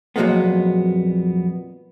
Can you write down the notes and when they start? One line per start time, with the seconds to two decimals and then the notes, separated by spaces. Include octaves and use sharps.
0.16 F2 A#2 F#3 G#3 A#3 B3